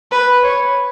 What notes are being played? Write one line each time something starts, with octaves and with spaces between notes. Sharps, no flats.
B4
C#5